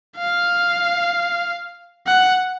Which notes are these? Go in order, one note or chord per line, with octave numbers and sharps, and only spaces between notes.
F5
F#5